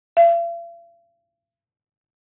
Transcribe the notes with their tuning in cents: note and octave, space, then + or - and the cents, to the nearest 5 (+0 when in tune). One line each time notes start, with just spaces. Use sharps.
F5 -45